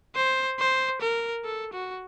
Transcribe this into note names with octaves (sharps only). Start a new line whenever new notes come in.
C5
C5
A#4
A4
F#4